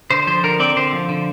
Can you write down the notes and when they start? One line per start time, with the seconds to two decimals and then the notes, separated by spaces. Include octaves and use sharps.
0.10 D3 C5
0.27 F3 C5
0.44 D3 A#4
0.60 C4 D5
0.77 D3 C5
0.93 F3
1.09 D3